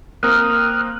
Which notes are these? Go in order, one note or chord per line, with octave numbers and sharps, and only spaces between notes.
A#3 C4 A#4 D#6 F6 F#6